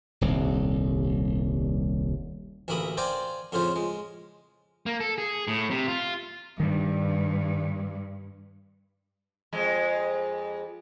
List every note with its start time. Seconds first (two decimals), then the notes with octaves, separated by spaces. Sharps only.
0.21 D#1 C2
2.68 A1 D2 A#3 E5 B5 D#6
2.97 C5 D5 F5 G5 G#5 A#5
3.52 F2 A2 C#3 F4 C5 F5
3.76 G#3
4.86 A#3
5.00 A4
5.18 G#4
5.48 A2
5.71 C3
5.88 F4
6.60 G2 D#3 G3
9.53 F2 G#3